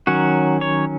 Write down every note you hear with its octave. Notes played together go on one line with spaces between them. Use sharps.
D#3 F#3 C#4 F#4
C#5